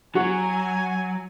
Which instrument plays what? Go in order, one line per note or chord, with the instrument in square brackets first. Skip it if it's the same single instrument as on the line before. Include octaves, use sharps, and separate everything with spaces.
[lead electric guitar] F#3 [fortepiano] F#4 [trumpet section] G#5